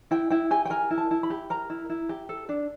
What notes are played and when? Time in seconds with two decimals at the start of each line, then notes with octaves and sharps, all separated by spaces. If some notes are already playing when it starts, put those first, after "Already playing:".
0.11 E4 G5
0.30 E4 G5
0.51 G4 G#5
0.65 G5
0.70 A#4 G#5
0.91 E4
0.98 A5
1.11 E4
1.23 B5
1.30 G4
1.50 A#4 A#5
1.70 E4
1.90 E4
2.09 G4
2.29 A4
2.49 D4